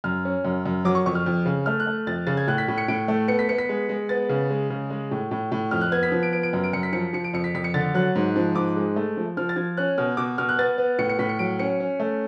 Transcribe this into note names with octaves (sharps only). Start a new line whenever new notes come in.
F#2 F6
C#4
F#2
F#2
F#3 D6
C#6
F2 C#6
F6
F2
C#3
A3 F6
F#6
A3
F2 A6
C#3 A6
G#6
A2 F#6
B6
A2
C#7
A2 D7
A3
B3 C#7
B6
B3 C#7
B6
G#3
G#3
B3 A6
C#3
G#3
C#3
G#3
A2
A2
A2
F2 F6
F#6
B3 G#6
B6
F3
D7
B3 D7
D7
F#2
D7
F#2 C#7
B6
F3 C#7
F3 C#7
D7
F2 C#7
B6
F2 B6
C#7
D3 A6
F#3 F#6
G#2
F3
G#2 D6
G#3
A3
F3
F3 F6
A6
F3 G#6
C#4 F#6
B2 F6
B2 D6
B2 F6
F#6
B3 A6
B3
A2 C#7
C#7
A2 B6
C#7
F#3 D7
C#4 C#7
C#4
A3